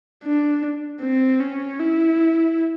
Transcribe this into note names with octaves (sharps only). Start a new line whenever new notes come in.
D4
C4
C#4
E4